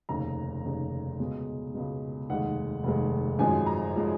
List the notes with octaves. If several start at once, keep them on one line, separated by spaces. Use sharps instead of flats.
F1 D#2 C#3 A#5
F1 D#2 C#3
C#2 B2 G#3
C#2 B2 G#3
F1 D#2 D#3 G#3 F#5
F1 D#2 D#3 G#3
G#1 F#2 F3 G#3 G#5
A#5
F3 G#3